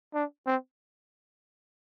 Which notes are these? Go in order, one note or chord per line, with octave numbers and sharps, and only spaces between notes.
D4
C4